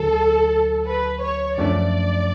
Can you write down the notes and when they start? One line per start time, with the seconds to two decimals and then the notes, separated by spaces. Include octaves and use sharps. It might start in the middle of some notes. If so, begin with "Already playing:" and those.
Already playing: D2 D3 F#3 A4
0.87 B4
1.22 C#5
1.57 F#2 F3 A3 D4 D5